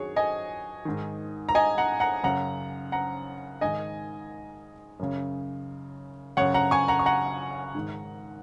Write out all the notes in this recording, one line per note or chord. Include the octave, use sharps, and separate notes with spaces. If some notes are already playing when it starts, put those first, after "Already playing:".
Already playing: F#2 D#3 F#4 G#4 C#5
D#5 G#5
G#2 D#3
A#5
D#5 G#5
F#5 A#5
F#5 A#5
F#2 C#3 F#5 A#5
F#5 A#5
G#2 D#3 D#5 G#5
F#2 C#3
F#2 C#3 C#5 F#5
F#5 A#5
G#5 C#6
F#5 A#5
C#6
F#5 A#5
G#2 D#3